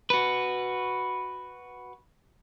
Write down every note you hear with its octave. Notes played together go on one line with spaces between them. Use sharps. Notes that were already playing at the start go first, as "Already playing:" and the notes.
F#4 B4